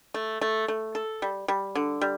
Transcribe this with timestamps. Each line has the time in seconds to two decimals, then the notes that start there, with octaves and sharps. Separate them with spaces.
0.14 A3
0.41 A3
0.68 A3
0.95 A4
1.22 G3
1.48 G3
1.75 D3
2.01 G3